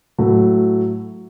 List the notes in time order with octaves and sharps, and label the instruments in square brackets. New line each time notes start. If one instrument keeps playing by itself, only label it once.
[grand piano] A2 F#3 A3